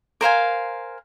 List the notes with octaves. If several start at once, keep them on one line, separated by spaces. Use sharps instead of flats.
A#4 C5 F5 G#5